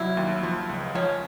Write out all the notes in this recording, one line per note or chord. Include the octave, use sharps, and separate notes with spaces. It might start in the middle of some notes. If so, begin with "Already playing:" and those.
Already playing: C2 F#3 E4
D#2
F3
C#2
F3 C#4